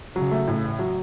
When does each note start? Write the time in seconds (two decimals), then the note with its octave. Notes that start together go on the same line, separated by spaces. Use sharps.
0.16 C#3 F#3
0.31 A3
0.48 A2
0.64 A1
0.79 F#3